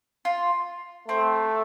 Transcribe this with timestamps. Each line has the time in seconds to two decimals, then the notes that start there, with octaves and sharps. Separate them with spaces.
0.25 F4
1.08 A3 C4